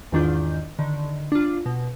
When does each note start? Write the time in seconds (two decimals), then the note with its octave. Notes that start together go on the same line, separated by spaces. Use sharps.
0.12 E2 G#2 D#3 D4 F4 G6
0.79 D3 D#3
1.32 D4 F4
1.66 B2